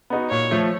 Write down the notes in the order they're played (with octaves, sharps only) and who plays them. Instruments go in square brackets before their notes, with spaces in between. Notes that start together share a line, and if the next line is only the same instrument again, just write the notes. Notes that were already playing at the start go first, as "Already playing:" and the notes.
[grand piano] B3 D#4 F#4
[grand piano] A#2 [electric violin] C#5
[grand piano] F3 A3